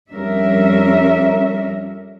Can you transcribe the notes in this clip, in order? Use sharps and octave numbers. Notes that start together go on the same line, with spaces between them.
F2 G3 C#4 D4 A#4 E5